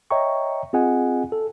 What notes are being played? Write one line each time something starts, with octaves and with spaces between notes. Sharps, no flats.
C#5 D#5 E5 G5 A#5 C#6
C4 F4 G#4 D#5 F#5 G#5
A4